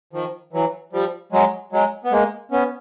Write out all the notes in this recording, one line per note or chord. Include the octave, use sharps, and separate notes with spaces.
D#3 F3
E3 F#3
F3 G3
F#3 G#3
F#3 G#3
B3
G#3 A#3
B3 C#4